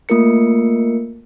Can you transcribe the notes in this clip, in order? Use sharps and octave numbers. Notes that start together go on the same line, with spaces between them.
A3 A#3 F4 A#4 C#7